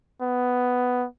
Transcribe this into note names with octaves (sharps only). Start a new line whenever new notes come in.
B3